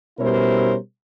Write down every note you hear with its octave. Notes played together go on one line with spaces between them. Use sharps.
B2 G3 C#4 E4 A#4 C5